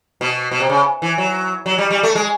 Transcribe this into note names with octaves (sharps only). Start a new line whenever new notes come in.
B2
B2
C3
C#3
E3
F#3
F#3
G3
G3
A3
G#3